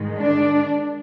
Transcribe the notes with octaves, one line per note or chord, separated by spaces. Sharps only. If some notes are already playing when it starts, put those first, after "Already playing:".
Already playing: G#2 D#3 G#3
D4